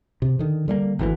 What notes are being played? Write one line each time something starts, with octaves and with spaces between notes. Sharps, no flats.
C3
D3 D#3
D3 G3 A3 A#3
G#1 D2 D#3 E3